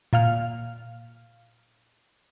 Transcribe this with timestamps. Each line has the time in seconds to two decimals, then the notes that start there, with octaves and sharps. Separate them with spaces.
0.13 A#2 F5 F6